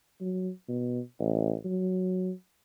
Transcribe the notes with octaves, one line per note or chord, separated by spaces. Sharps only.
F#3
B2
A1
F#3